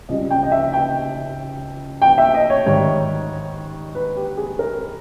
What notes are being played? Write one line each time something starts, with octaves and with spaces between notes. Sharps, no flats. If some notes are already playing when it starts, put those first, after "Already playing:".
C#2 C#3 G3 D#5
G5
D#5
E5
G5
G5
E5
D#5
C#5
G#2 D#3 G3 C#5
B4
G4
G#4
A#4